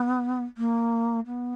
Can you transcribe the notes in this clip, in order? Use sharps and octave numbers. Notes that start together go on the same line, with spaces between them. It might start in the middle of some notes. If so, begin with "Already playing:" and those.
Already playing: B3
A#3
B3